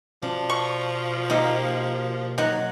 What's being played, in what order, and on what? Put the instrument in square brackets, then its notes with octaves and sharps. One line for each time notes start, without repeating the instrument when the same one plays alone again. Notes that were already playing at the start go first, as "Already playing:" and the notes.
[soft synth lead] B2 [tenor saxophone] F3 [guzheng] D4
[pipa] C#6
[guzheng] A#3 G4 A#4 [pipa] D#4
[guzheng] F#3 [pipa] D#4 F#5